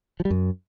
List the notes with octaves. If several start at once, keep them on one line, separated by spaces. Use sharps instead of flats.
F3
G3
F#2